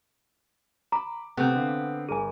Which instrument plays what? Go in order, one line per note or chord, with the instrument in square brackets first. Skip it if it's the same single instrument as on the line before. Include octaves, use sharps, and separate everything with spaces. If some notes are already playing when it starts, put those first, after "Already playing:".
[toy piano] A#5 [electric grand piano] B5 D6
[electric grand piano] C3 A3 [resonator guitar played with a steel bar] B3 C4
[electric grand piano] D3 F5
[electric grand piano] G1 A#4 D#7 [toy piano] G#4 G#5